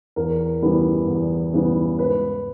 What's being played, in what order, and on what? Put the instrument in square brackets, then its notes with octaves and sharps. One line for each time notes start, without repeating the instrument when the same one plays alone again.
[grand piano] E2 A#4
C#3 E3 G3 B3
E2
C#3 E3 G3 B3
G#2 B4